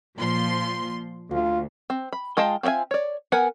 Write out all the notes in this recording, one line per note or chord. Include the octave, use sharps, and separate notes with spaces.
A#2 F3 C6
D2 F4
C4
B5
G#3 F4 D#5 G5 A5
C4 F4 D#5 E5 G#5
C#5 D5
B3 A#4 B4 F#5 G#5